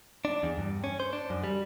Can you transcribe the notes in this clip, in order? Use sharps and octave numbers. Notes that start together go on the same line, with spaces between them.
D4
E2
G2
C#4
C5
D4
F#2
G3